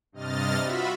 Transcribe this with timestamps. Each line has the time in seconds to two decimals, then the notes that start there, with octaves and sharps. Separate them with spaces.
0.12 G2 C3 D#5 F6 A6
0.63 F4 F#4 E5 B5